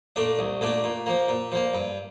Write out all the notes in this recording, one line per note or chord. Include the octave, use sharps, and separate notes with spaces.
A#2 A3 D4
C2
A#2 A3 D4
A#2
F3 A#3
A#2
F3 A#3
G2